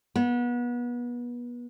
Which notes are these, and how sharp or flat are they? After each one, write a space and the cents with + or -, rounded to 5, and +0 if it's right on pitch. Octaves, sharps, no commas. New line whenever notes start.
B3 -30